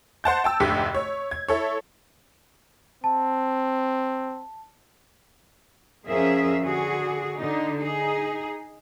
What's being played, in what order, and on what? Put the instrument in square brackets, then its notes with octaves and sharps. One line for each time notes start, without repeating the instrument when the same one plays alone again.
[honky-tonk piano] C5 F#5 A5 G6
G5 A5 E6
F1 D2 G#2 D3 G4 B6
C#5
G#6
E4 A4 C#5
[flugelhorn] C4 [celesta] A5
[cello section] F2 F3 C#4 G#4 A#4 E5
D3 F#4 G#4
D3 D#4
D#4 G#4